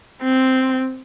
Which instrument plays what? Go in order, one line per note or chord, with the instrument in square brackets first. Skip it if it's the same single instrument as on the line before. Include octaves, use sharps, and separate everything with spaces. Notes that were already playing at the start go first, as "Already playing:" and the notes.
[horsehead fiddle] C4